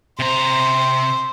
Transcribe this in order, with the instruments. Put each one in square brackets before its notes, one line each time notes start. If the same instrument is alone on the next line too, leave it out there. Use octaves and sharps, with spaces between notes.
[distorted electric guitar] C3 A#5 [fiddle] C5